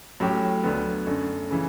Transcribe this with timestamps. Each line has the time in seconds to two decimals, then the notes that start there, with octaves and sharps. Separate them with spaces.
0.20 A2 F#3 C#4 G4
0.63 D2 D3 F#3 B3
1.07 F#2 D3 A3
1.51 C#3 E3